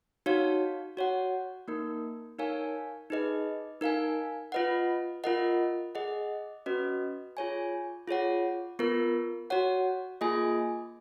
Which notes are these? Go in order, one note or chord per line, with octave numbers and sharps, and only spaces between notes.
D#4 F#4 C#5 F5
F#4 C#5 F#5
A#3 D#4 A#4
D#4 A#4 C#5 F5 G#5
D#4 G#4 B4 D#5
D#4 A#4 F5 G#5
F4 B4 D#5 F#5
F4 A#4 D#5 F#5
G#4 D#5 F#5
C#4 F#4 B4 D#5
F4 G#4 C#5 G#5
F4 G#4 C#5 F#5
B3 F4 A#4
F#4 C#5 F#5
A#3 F4 G#4 D#5 G#5